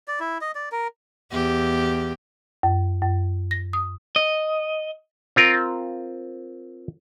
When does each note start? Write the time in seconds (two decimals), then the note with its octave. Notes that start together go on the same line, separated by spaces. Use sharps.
0.08 D5
0.20 E4
0.41 D#5
0.55 D5
0.72 A#4
1.31 E2 G4
2.63 F#2
3.02 F#2
3.51 A#6
3.73 D#6
4.16 D#5
5.36 C4 F4 A#4